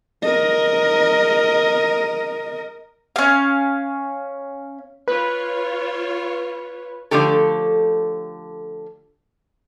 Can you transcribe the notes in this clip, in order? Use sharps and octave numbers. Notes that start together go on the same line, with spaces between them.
A#4 D#5
C#4 F5
F4 B4 C#5
D3 F3 A3 G4 A4